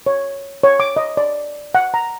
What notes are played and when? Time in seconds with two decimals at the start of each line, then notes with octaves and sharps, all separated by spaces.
0.06 C#5
0.64 C#5
0.80 D6
0.97 D#5
1.17 D5
1.75 F#5
1.94 A#5